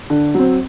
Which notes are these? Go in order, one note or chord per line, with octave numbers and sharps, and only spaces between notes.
D3
F#3 C4